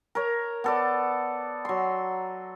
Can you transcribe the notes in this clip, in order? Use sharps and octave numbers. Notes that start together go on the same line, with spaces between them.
A#4 C#5
B3 A4 D5
F#3 C6